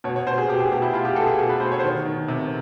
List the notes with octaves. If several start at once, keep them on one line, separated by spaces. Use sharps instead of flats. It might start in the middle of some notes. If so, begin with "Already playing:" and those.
B2 C#5
C#5
B2 C5
G#4
B2 G4
G#4
B2 G4
E4
B2 F4
G4
B2 A4
G#4
B2 G#4
B4
B2 C5
C#5
C5
D#3 C#5
D#3
C3